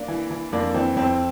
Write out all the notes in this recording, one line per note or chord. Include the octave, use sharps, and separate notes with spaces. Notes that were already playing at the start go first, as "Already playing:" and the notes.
Already playing: A#3 D4
E3
E3
F2 A#3 D4
E3 C4
F2 C4